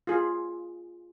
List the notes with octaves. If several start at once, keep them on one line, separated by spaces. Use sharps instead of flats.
F4 G#4